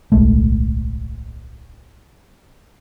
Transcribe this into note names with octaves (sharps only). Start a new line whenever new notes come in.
D1 B1 G#3 A3